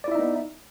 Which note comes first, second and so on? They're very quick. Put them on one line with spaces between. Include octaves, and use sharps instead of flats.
D5 E4 E5 D#4 B3